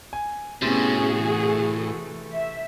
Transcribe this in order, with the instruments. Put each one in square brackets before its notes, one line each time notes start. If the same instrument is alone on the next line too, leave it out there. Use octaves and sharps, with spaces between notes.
[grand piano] G#5
[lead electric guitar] A2 [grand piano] C3 C6 A6 [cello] B3 C#4 [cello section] F#4 G#4
[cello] E3 A3
[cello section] E5